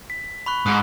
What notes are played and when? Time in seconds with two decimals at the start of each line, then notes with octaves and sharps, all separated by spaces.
0.10 B6
0.46 B5 C#6 F#6
0.66 G#2 D#6 F#6